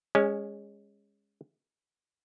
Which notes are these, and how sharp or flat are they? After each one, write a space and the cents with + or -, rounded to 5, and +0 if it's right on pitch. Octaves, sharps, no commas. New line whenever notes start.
G#3 -20 C#4 +0